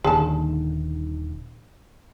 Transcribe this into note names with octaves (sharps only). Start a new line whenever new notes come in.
D#1 D3 D#3 G#4 A5